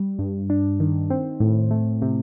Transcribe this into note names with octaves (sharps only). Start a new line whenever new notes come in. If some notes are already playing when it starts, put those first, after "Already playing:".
Already playing: G3
G2
D4
D#3
C4
A2
A3
C3